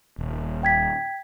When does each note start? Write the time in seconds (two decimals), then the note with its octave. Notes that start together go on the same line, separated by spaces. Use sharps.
0.18 D#1
0.63 G5 G#6 B6